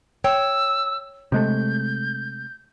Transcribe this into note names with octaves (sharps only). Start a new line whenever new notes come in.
C#5 G5 E6
C3 G#3 A3 G6